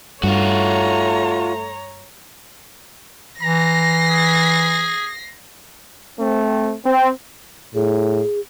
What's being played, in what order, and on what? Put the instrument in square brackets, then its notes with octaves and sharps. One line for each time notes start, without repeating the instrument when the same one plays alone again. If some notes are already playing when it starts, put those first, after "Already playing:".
[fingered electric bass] G2 [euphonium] A3 [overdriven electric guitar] F4 F#4 [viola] C#5 A#5
[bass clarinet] E3 [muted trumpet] A#5 [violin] A#6 C7
[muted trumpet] G#4
[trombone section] A3 C4
C4
[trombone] A2 [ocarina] G#4